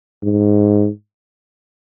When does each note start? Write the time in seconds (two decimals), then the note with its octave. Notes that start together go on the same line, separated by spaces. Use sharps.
0.23 G#2